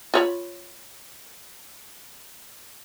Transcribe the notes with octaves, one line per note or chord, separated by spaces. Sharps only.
F4 C#5 B5